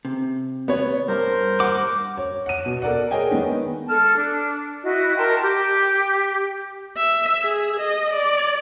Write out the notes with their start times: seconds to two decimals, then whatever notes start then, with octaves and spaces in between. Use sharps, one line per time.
0.05 C3
0.68 B3 C#5
1.08 G2 A#4 C5
1.60 F#5 D6
2.17 C#5
2.46 F#5 D#7
2.66 B2
2.82 A4 A#4 D5 F#5
3.11 G#4 A#4 C#5 D#5 G5 G#5
3.31 D#3 G#3 B3 D#4
3.87 A4 A5 F6
4.14 D4
4.83 E4 F#4 D#5
5.17 A#4 G5 A5 C6
5.40 G4
6.97 E5
7.43 G#4
7.80 D#5
8.14 D5